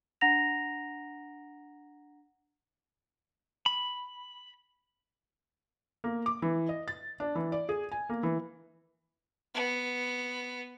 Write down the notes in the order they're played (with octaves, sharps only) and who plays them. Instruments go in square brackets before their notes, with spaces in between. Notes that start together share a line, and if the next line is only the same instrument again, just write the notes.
[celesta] D4 F#5 A#5 A#6 F7
[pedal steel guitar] B5
[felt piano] A#3
D6
E3
D#5
A6
D4
E3
D5
G#4
G#5
A#3
E3
[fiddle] B3